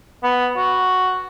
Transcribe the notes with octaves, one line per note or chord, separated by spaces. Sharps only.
B3
F#4